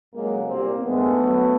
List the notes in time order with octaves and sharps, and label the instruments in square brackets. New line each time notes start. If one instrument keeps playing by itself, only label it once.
[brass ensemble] F2 C#3 F#3 G#3 A#3
C2 A#2 G3 A#3 C4
G2 D#3 G#3 A3 B3
F#2 D3 F#3